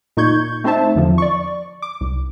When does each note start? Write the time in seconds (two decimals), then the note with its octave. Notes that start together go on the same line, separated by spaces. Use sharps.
0.17 A#2 D#4 C#6 G6 G#6
0.64 A3 C4 D#4 C5 E5 A5
0.95 E2 D3 F3
1.18 D5 C#6
1.82 D6
2.01 C2